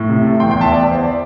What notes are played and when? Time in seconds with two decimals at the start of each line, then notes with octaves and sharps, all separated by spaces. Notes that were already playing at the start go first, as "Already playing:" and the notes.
Already playing: A2
0.09 C3
0.24 A3
0.40 E2 G5 C6
0.51 G5 C6
0.56 E2
0.61 E5 A5
0.72 E2 D5
0.87 E2 C5
1.03 D5